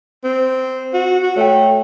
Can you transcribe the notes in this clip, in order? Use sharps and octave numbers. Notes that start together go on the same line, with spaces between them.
C4
F#4
F#4
A3 C#5 G5